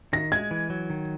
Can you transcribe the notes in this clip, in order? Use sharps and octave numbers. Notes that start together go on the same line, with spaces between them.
D#3 A#6
G#3 G#6
E3
F#3
D#3